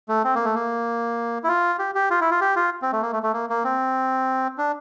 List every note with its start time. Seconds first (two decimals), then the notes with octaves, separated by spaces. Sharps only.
0.08 A3
0.24 C4
0.35 A#3
0.45 A3
0.55 A#3
1.44 E4
1.49 F4
1.79 G4
1.95 G4
2.11 F4
2.21 E4
2.31 F4
2.41 G4
2.56 F4
2.82 C4
2.92 A3
3.02 A#3
3.13 A3
3.23 A3
3.33 A#3
3.50 A#3
3.64 C4
4.58 D4